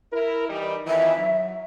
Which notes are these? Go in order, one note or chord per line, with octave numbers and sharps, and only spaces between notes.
E4 A#4
E3 G3 D#4
F2 D#3 E3 E5
F#3